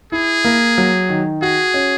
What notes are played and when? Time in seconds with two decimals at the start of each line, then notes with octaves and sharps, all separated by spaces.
0.12 E4 G#4
0.44 A#3
0.78 F#3
1.09 D#3
1.42 F#4 G#4
1.74 C#4